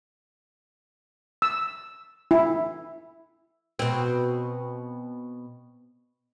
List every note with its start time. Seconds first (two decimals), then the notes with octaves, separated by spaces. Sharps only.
1.42 E6
2.31 E4
3.79 B2 C4